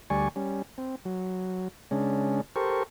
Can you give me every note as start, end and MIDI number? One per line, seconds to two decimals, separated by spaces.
0.10 0.28 38
0.10 0.28 55
0.10 0.28 74
0.10 0.28 80
0.10 0.28 85
0.36 0.62 55
0.36 0.62 61
0.78 0.96 60
1.05 1.68 54
1.91 2.41 49
1.91 2.41 56
1.91 2.41 61
1.91 2.41 62
2.56 2.83 67
2.56 2.83 69
2.56 2.83 70
2.56 2.83 72
2.56 2.83 85